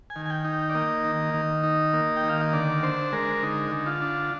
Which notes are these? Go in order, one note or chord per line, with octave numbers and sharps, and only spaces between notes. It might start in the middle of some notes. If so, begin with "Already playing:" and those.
G#5
D#3
G#5
G5
D#4
D5
A#3 D#5
D#3
D#3
D#4
A#3
G5
D#3
F5
D#5
D3 D5
D4 C5
G#3 A#4
D3 D#4
D3
F4
D4